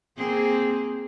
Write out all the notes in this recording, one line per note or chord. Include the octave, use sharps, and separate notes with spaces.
A#3 C4 G#4